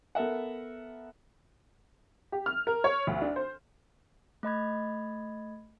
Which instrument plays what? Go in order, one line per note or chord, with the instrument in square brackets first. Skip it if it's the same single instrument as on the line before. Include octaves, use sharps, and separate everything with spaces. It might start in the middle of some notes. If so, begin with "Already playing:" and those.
[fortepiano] B3 A4 A#4 E5 F#5
[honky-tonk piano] G4
F6
A#4
C#5
D2
D4
C5
[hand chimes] A3 D#5 B5 G#6